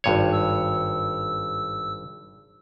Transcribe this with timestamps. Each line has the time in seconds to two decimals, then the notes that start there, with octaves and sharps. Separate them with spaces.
0.04 G#1 G2 C#5
0.32 E6